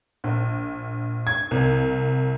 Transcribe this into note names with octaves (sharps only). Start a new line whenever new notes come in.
A#1
G#6
C2